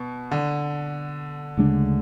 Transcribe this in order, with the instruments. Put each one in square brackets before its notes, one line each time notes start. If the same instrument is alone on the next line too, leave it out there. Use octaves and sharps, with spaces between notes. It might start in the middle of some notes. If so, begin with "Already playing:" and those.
Already playing: [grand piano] B2
D3
[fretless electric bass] D2 C#3 G#3 D4